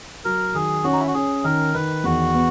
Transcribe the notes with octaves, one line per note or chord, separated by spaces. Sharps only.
F#3 A#4
D#3 G#4
C#4 F#4
D#4
E4
F#4
C#4 G#4
D#3 A#4
D#3 B4
E2 F#4
B3